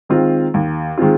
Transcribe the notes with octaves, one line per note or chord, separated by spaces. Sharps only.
D#3 G#3 C4 F4
D#2
D#3 G#3 C4 F4